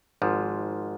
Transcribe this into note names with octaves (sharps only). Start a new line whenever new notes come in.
G#1 G#2 F3